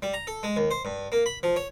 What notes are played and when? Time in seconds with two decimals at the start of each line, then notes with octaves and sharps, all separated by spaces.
0.02 G3
0.14 A#5
0.27 A4
0.43 G#3
0.57 D#2
0.71 C5
0.85 G2
1.12 A#3
1.26 B5
1.43 F3
1.56 C#5